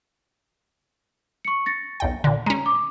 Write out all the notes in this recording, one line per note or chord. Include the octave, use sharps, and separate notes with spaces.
C#6 C#7
A6 A#6 C#7
B1 E2 G5
A#2 D3
G#3 C#4 A#5
D6